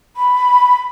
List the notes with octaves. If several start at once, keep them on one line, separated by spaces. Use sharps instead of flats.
B5